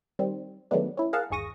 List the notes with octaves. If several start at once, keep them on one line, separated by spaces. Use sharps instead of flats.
D#3 G3 C4
D#3 F#3 G#3 A3 B3 D4
C#4 E4
G#4 A#4 F5 F#5 A5
G1 D#2 G#4 C#6 D#6 A#6